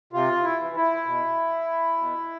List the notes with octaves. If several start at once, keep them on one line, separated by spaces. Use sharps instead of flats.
C3 F4
E4
E3
E4
B2
B2